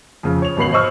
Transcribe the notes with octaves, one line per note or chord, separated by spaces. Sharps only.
F2 C#3
C#5 F7
G#1 B2 B5 C7 F#7
C5 D#5 C#6 E6 F6